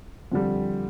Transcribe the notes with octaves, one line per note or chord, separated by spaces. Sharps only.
F2 D3 G3